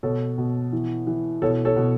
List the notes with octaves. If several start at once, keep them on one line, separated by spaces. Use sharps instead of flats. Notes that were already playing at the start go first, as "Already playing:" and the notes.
B2 A4 C#5
B2
E3
E3
B2 A4 C#5
A4 C#5
B2